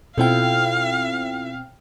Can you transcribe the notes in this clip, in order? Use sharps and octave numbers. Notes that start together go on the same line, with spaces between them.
B2 C4 E4 F4 A4 F5 G5